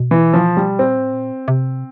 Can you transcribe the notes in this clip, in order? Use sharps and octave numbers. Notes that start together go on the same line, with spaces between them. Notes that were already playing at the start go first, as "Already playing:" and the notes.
Already playing: B2
E3
F3
G3
A#2 C4
A2
A#2
C3